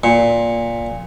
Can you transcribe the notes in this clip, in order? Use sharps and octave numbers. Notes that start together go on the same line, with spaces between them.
A#2